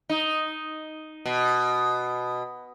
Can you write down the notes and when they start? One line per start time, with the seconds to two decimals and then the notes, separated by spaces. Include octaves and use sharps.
0.09 D#4
1.25 B2